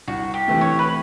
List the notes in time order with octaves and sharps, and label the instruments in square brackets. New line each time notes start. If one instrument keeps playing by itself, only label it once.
[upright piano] C2 [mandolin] F#4
[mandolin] G4
[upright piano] C3 E3 A3
[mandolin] C#5
B4